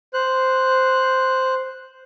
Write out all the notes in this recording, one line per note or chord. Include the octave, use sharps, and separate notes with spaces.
C5 F#6